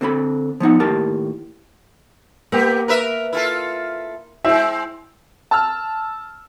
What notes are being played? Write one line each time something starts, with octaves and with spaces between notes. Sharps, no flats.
D3 C4 A4 B5
F3 B3 D#4 F#5
D#2 A2 G4 A#4 A5
A#3 B3 G4
A#4 B4 E5
E4 F4 A4
G#3 C4 E4 E5
A5 E6 F6